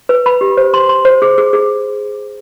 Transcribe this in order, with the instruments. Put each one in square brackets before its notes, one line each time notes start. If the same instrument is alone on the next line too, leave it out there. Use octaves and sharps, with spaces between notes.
[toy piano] B4
B5
G4
C5
C6
C6
C5
G#4
G#4
G#4